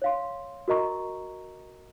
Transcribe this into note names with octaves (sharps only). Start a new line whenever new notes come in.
C#5 F5 C6
F#4 A#4 D#5 A#5 C#6